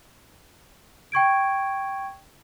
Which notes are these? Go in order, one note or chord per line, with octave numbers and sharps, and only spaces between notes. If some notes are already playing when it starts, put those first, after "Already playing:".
G5 C#6 G#6 D7